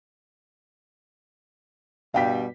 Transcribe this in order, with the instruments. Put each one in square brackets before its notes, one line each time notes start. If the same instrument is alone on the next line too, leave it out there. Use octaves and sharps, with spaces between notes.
[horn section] G2 B2 G3 [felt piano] F5 G5 B6